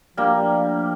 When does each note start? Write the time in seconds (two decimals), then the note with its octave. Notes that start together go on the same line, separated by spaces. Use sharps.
0.17 F3 G3 A3 A#3 D4 G4